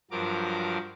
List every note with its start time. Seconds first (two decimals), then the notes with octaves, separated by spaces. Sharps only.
0.11 G2 F3 F#3 A#4 D6